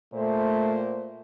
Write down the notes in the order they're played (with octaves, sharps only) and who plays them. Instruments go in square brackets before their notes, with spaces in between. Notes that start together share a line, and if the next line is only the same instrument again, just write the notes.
[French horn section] A#2 C5 [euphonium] A3